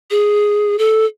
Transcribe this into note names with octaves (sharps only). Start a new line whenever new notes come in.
G#4
A4